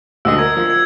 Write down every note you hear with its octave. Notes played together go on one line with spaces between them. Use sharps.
D2 D3 D#5 E6
A#4 G#6
F3
G#6